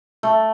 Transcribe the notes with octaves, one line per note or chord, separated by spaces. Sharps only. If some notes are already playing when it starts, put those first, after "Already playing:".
A3